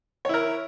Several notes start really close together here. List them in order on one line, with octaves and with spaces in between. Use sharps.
C#5 E4 A#4